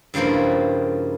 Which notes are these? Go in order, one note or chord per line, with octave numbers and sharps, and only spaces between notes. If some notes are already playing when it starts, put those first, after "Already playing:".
G2 C#3 F3 A#3 E4